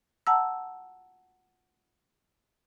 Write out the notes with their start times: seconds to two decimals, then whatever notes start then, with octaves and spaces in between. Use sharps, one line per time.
0.27 F#5 A5 A#5 E6